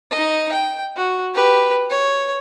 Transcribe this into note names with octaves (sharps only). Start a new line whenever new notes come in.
D#4 D#5
G5
F#4
G4 B4
C#5